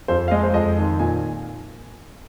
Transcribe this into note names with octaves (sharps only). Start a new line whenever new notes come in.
F2 C5
F5
G#3 D#5
C5
F2 D#5
D#3
A#2 G#5